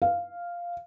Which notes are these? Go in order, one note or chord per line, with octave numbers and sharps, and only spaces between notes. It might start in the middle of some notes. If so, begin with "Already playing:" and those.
F5